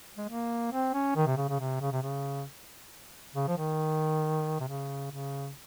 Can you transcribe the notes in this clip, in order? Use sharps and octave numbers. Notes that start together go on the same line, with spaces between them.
G#3
A#3
C4
C#4
D#3
C3
C#3
C#3
C3
C#3
C3
C#3
C#3
F3
D#3
C3
C#3
C#3